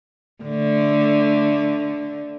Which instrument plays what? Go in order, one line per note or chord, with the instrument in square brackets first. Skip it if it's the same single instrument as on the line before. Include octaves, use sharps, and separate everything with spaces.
[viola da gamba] D3 A3